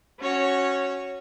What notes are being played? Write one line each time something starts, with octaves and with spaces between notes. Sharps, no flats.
C#4 F#4 C#5